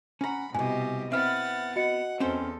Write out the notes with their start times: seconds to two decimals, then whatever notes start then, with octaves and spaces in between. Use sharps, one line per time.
0.21 C#4 F#5 A#5 B5
0.54 C2 G#2 B2 G4 D#5 G#5
1.12 B3 C4 E4 E5 F#5 F6 A6
1.76 F#4 D#5 F#5 C#7
2.20 E2 C4 C#4 A4 C5